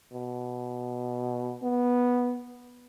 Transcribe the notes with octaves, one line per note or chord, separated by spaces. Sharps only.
B2
B3